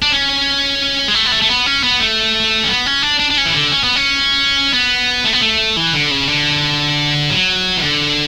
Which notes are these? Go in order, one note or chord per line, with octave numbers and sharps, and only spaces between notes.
D4
C#4
G#3
A3
B3
A3
A3
B3
C#4
B3
A3
C#4
B3
C#4
D4
D4
D4
C#4
E3
D3
C#4
B3
C#4
B3
A3
B3
A3
E3
D3
C#3
D3
F#3
E3
D3